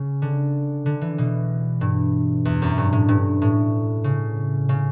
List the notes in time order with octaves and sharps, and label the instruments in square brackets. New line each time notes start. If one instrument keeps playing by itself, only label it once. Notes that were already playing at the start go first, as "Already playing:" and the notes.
Already playing: [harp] C#3
D3
D3
E3
B2
G2
E2
F#2
G2
A2
G2
A2
C#3
C#3